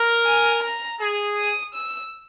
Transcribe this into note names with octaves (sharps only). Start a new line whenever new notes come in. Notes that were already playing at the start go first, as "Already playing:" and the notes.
Already playing: A#4
G#5
A#5
G#4
D#6
E6